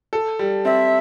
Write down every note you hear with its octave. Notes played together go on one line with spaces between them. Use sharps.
A4
G3
C4 E5